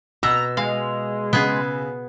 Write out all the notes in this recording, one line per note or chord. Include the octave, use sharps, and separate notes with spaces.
B2 A#5 E6
G#3 F5
C#3 B3 G#4